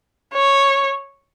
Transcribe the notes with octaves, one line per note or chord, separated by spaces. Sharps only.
C#5